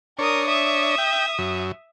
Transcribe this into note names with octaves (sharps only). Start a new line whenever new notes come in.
D4 A#4 C#5 D#6
E5 D#6
G5
F#2